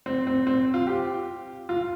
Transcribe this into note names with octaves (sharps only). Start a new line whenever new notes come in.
C4
C4
C4
F4
G4
F4